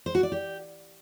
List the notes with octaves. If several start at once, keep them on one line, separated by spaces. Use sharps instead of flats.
C5
F#4
D5
G4